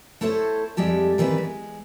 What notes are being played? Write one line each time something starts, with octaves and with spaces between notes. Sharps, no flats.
A3 E4 A4 C5 C#5
F2 G3 G#3 G4 A4 E5
D#3 E3 G3 C4 B4
G#3